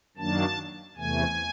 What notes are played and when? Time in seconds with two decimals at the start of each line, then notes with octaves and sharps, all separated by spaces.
0.17 F#2 D#3 F#3 A#3 D4 A5
0.97 E2 C3 E3 A3 G#5